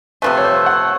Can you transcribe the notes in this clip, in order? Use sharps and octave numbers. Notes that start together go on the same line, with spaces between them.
C3 F3 A3 B4
C#5
C5
F#5